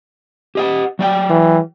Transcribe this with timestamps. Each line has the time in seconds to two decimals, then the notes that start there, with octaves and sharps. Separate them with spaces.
0.55 G4 D#5 F#5
0.99 F#3 D5 G5
1.30 E3